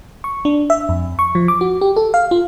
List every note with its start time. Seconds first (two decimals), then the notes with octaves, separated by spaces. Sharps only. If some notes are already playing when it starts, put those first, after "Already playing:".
0.24 C#6
0.45 D4
0.70 E5
0.89 F2
1.19 C#6
1.35 F3
1.48 D6
1.61 F#4
1.81 G4
1.96 A4
2.14 F5
2.31 F4